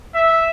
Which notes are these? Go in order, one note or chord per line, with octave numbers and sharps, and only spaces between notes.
E5